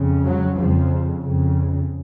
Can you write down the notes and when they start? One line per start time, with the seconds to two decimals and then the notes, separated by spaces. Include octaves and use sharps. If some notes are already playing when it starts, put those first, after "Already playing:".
Already playing: F2 C#3
0.22 F#3
0.56 F2 C#3 F3
1.22 F2 C#3